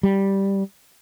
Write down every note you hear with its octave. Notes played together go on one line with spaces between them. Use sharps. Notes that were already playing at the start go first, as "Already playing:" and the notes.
G3